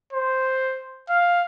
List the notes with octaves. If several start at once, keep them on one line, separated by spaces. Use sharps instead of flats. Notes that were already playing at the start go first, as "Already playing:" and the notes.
C5
F5